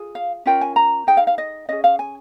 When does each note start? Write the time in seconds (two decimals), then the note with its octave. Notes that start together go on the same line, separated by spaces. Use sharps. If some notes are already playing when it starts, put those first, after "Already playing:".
Already playing: F4 G#4
0.15 F5
0.46 C#4 F4 A#4 G5
0.61 G#5
0.76 A#5
1.07 D#4 G#4 G5
1.17 F5
1.27 F5
1.38 D#5
1.69 C#4 G#4 D#5
1.84 F5
1.99 G#5